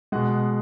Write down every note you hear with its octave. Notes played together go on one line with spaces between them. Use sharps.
B2 G#3 F#5